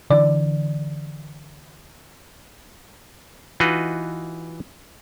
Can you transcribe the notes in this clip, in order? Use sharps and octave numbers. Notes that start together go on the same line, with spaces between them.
D3 E3 D5
E3 D#4 F4 F#4 B4 D#5